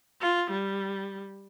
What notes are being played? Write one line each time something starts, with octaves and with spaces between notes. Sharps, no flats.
F4
G3